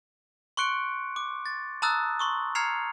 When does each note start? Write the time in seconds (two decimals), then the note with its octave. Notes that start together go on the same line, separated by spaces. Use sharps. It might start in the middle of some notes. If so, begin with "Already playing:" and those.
0.57 C6 C#6 F#6 C#7 D7
1.16 D6
1.46 A6
1.82 A5 A#5 D#6 E6 F#6 A6
2.19 C6 C#6 D#6
2.55 A#5 F6 G#6 C7 C#7 F7